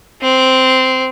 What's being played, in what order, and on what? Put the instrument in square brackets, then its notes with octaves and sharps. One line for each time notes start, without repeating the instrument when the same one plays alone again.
[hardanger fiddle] C4